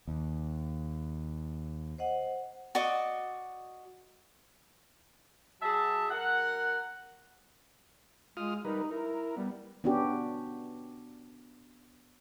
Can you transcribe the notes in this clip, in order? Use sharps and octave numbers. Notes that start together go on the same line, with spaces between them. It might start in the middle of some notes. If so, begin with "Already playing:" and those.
D#2
C5 D#5 F#5
F#4 D5 D#5 D6
F#3 G#4 E5 A5
F#2 A#4 F#5
G#3 F4 D#6 F6
G3 D#4 A#4 B4
E4 A#4
G3 B3
B3 C#4 D4 F#4 G4